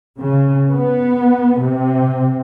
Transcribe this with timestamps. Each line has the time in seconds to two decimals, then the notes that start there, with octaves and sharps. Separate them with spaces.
0.17 C#3
0.68 B3
1.60 C3